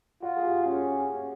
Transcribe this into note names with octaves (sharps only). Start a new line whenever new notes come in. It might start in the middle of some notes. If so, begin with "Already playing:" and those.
F4 F#4
G#4
G4
C#4 G#4